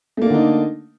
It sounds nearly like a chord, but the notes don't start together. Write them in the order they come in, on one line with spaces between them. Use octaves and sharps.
A3 A#3 D4 D3 D#4